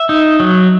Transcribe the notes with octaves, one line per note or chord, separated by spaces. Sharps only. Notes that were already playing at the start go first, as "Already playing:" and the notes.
Already playing: E5
D#4
F#3